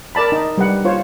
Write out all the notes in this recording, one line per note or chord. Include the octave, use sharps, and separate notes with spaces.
A#4 D5 A5 B5
D#4
G3 B4 F#5
F4 C5 C#5